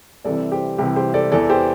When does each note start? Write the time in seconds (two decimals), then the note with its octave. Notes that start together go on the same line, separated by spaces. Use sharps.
0.25 C2 C3 E3 A4 D5
0.52 G4 C5
0.78 C2 C3 E3 G4
0.96 G4 C5
1.14 A4 D5
1.32 E2 E3 A4 D5
1.49 G4 C5